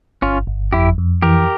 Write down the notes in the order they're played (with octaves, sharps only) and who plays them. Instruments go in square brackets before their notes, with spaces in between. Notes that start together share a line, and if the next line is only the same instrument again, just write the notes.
[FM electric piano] G1 [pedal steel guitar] C#4 F4
[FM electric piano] G1
[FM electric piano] F2 [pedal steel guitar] E4 G4
[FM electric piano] F2
[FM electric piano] E3 [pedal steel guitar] G4 A#4